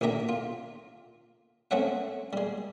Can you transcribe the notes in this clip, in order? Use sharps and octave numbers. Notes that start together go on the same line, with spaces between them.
A1 A#2 D3 G4 E5 A#5
F4
A3 C4 C#4 E5 F#5
G3 G#3